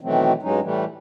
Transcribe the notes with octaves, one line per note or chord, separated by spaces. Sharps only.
B2 D#3 E3 F#3 A3 C4
G2 F#3 G#3 C#4 D#4
A2 E3 G3 A3